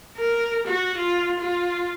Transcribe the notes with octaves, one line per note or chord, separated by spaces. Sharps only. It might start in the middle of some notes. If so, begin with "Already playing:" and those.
A#4
F#4
F4
F4